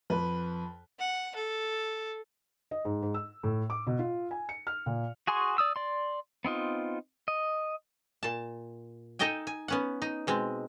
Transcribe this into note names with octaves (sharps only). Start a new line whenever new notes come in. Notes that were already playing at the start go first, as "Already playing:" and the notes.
F2 B4
F#5
A4
D#5
G#2
G#2
E6
A2
D6
B2
F4
G#5
C#7
F6
A#2
F#4 G#4 G#5 C6 C#6
D5 D#6 E6
D5 C6
B3 C4 D#4 F4
D#5
A#2 A5
D#4 A4 D#5 G5 G#5
G#5
B3 C#4 F#5
D#4
B2 G#3 C4